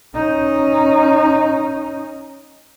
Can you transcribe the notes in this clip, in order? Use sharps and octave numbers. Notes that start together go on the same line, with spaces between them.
C#4 D#4